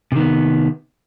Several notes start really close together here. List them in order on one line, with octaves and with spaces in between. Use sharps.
C3 D#3 B3